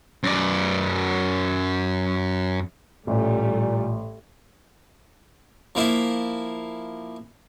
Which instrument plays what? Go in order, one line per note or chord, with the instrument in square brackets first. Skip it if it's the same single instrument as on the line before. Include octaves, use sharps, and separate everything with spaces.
[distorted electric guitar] F#2 D5
[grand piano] A1 [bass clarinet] A#2 [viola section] G3 A3
[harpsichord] F3 A#3 E4 E5